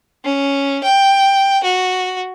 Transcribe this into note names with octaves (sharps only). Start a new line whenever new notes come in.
C#4
G5
F#4